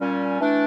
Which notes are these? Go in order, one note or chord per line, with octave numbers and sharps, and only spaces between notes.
A#2 G3 C#4
E3 A3 D4